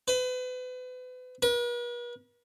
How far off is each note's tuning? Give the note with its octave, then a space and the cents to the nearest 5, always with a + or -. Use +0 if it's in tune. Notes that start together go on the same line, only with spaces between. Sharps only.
B4 +35
B4 -45